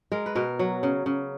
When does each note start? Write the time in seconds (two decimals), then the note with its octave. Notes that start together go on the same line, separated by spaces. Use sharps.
0.12 G#3 A#4
0.26 B4
0.35 B2 A#4
0.59 F#3
0.83 C#3
1.06 C#3